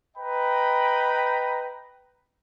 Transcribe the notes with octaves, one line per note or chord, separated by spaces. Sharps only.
B4 D#5 G5 A#5 B5